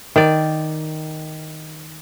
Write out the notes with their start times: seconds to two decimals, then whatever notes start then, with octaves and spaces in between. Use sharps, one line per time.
0.16 D#3 D5